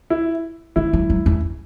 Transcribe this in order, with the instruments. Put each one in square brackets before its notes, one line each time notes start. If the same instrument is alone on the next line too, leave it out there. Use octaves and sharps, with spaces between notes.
[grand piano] E4
[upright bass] E3 [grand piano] E4
[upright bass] F#3
F#3
E2